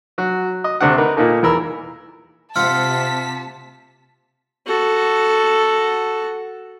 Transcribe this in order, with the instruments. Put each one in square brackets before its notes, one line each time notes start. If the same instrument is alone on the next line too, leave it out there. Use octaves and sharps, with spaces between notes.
[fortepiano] F#3 F#4
D#5
D2 C3 A3 D4 F#5
D#4 A#4 B4
A#2 A#3 D#4 A4
E2 E3 A#4 B5 E6
[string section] C3 B6 [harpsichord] C4 F4 F#5 [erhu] A5 [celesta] F6
[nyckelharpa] F#4 A4